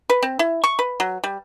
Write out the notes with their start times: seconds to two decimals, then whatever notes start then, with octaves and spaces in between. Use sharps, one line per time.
0.10 B4
0.22 C4
0.39 E4
0.64 C#6
0.79 B4
1.00 F#3
1.24 G3